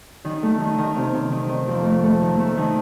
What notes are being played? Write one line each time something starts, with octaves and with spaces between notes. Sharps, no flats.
D#3
A3
D#3
D#3
C3
C3
D#3
D#3
F2
A3
A3
D#3
A3
D#3